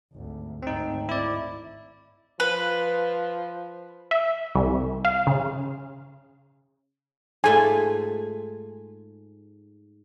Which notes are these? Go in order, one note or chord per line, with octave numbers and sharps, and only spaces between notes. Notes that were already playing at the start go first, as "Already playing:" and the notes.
G#1 D2
G#1 D2 C4 D#4
E4 D5
F3 B4
E5
C2
F5
C#3
G#2 A3 F4 G#5